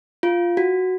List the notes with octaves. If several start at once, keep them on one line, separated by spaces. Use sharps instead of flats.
F4
F#4